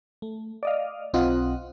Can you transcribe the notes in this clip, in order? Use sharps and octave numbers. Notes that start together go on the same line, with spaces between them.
A3
D5 D#5 F5
B1 C4 F4 D#5 F#5